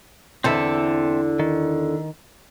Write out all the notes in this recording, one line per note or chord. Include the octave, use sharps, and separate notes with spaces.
E2 D3 C4 A4 E5
D#3